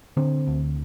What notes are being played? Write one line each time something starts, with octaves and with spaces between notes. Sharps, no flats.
D3 C4
D2